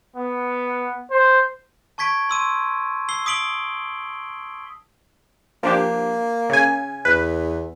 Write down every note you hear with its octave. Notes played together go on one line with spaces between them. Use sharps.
B3
C5
A5 C#6 G#6 B6 D7
C6 E6 D#7
E6 C7 G7
D#6 B6 D7 F#7 G7
F3 A#3 D4 G4
C#3 G#5
E2 B4